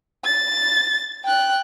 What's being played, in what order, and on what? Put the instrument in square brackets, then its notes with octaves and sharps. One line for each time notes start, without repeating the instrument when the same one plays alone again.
[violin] A6
G5 F#6